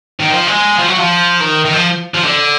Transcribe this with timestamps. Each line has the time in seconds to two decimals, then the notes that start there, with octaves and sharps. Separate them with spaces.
0.20 D#3
0.31 F3
0.47 G#3
0.79 F3
0.88 F#3
0.99 F3
1.41 D#3
1.65 D#3
1.73 F3
2.14 F3
2.25 D3